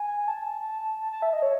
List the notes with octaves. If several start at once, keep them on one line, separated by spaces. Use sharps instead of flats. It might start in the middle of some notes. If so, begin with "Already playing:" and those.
Already playing: G#5
A5
A5
E5
D#5
C#5